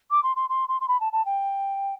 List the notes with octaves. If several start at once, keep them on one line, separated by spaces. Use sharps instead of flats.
D6
C6
C6
C6
C6
C6
B5
A5
A5
G5